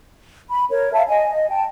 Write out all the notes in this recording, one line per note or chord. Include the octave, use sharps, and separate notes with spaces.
B5
A#4 C#5
E5 F5 A5
D#5 G#5
D#5
G5 A5